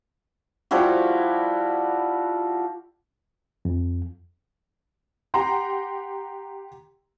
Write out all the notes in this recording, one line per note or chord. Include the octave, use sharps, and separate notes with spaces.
F3 G3 E4 F#4
F2
G4 F#5 A#5 C6